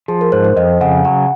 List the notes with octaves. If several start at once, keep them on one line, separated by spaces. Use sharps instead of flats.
F3 G#4
A#4
G#2 C5
C5
F2 D#5
C#3 F#5
F#3 F#5